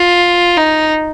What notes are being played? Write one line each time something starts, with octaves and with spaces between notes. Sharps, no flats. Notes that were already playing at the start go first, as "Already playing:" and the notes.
Already playing: F4
D#4